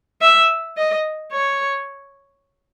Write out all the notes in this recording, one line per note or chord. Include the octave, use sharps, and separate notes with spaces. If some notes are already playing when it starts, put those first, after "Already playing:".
E5
D#5
C#5